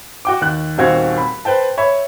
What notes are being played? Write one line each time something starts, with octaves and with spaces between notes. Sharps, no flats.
F#4 G5 D6
D#2 F#6
D#1 D#2 C4 F#4 F5 G#6
B5
B4 C5 G5 A5
C#5 E5 B5